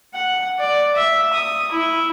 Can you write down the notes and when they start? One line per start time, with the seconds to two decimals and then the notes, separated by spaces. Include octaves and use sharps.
0.14 F#5
0.59 D5
0.95 E5
1.34 D#6
1.71 E4